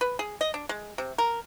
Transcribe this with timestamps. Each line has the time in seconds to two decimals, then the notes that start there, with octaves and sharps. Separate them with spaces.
0.01 B4
0.19 G#4
0.41 D#5
0.54 D4
0.69 G#3
0.98 C3
1.18 A#4